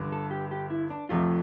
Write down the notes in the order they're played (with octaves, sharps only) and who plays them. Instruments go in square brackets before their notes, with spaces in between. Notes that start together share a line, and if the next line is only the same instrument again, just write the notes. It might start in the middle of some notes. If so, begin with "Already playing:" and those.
Already playing: [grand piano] G1 G2 D3
[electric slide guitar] A4
G4
G4
E4
D4
[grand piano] F1 F2 C3 F3 A3 [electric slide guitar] F4